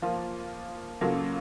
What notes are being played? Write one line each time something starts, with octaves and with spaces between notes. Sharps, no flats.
F3 A#3 F4
C#3 F#3 A#3 F4 A4